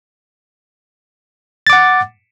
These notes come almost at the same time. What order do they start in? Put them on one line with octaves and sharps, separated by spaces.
A6 D6 F#5